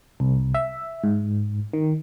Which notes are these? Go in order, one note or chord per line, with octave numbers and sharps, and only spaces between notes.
C2
E5
G#2
D#3